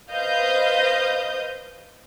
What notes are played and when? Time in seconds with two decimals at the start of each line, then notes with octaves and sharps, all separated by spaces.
0.12 B4 C5 D#5 F5 D#6 G6